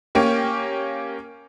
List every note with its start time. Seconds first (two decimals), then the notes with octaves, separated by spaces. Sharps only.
0.15 A#3 C#4 G4